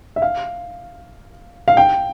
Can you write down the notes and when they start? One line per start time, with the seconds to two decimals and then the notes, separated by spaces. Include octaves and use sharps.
0.16 E5
0.22 F5
1.68 F5
1.77 G5